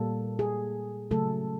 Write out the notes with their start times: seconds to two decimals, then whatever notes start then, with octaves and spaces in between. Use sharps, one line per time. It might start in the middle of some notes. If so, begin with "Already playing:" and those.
Already playing: A#2 G3 A#3 A4
0.39 G#4
1.11 C#3 F#3 A3 A4